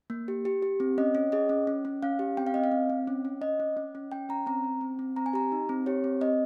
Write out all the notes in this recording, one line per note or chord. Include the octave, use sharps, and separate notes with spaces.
A#3
G4
G4
G4
C4
C#4 D#5
C#4
G#4 D#5
C#4
C#4
C#4
C#4 F5
G4
C4 G5
F5
C4 D#5
F5
C4
C4
C#4
C#4
C#4 D#5
C#4
C#4
C#4
C#4 G5
C#4 A#5
C4 A#5
C4
C4
C4
C4 A#5
G#5
G4 A#5
D#4
C4
G4 C#5
C4
C4 D#5